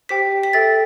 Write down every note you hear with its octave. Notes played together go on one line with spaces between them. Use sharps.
G4 C5 G5 B6
B6
A4 E5 G5 A6